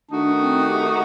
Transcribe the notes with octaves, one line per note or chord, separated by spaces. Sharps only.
D#3 A3 D4 D#4 F#4
C4
G4